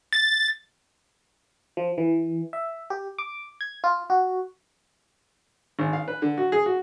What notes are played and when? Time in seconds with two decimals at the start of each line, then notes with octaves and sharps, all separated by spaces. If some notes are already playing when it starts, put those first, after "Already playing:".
0.13 A6
1.77 F3
1.98 E3
2.53 E5
2.90 G4
3.19 D6
3.61 G#6
3.84 F4
4.10 F#4
5.79 G#1
5.93 F5
6.08 B4
6.22 D3
6.38 F#4
6.52 G#4
6.66 F#4